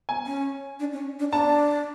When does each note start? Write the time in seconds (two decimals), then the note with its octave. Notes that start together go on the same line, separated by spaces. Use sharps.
0.09 G#5
0.26 C#4
0.80 D4
0.93 C#4
1.19 D4
1.32 D4 A5